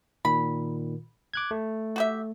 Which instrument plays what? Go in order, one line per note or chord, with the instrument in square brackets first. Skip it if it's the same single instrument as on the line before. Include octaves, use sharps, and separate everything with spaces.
[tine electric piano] A#2 D#3 [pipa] B5
[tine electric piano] D6 F#6 G#6
A3
[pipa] F#4 G4 E5